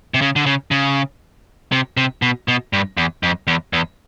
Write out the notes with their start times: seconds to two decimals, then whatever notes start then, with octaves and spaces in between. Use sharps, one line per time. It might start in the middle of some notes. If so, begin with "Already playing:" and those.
0.14 C3
0.21 C#3
0.36 D3
0.46 C#3
0.71 C#3
1.72 C3
1.97 C3
2.22 B2
2.48 B2
2.73 G2
2.97 E2
3.23 F2
3.47 E2
3.73 E2